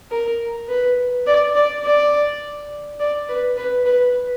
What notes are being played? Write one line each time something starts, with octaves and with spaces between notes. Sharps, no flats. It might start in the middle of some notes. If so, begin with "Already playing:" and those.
A#4
B4
D5
D5
D5
D5
B4
B4
B4